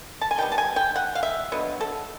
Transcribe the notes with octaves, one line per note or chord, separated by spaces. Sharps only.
A5
G#5
D#3 G3 B3 G5
A5
G#5
G5
F#5
F5
E5
D3 F#3 B3 D#5
A4